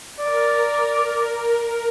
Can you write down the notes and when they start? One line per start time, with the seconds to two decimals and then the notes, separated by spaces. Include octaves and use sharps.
0.19 A#4 D5